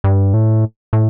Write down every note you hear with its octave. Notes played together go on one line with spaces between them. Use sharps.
G2
A2
A2